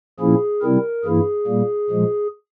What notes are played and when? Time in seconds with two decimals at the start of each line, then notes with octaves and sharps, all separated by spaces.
0.20 A#2 F3 A#3 C#4 E4 G#4
0.62 C3 G3 C4 E4 A#4
1.05 G2 E3 A#3 E4 G#4
1.47 A#2 G3 A#3
1.90 A#2 F3 G#3